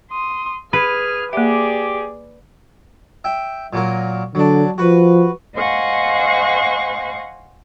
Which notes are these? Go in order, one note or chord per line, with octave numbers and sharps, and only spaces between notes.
C6 D#6
G#4 B4 F6
A#3 G4 G#4 D5 E5
E5 G5
A#2 F#3 A#4
D3 F#3 D4
F3 F#4 B4
C5 D#5 F5 F#5 G#5 C#6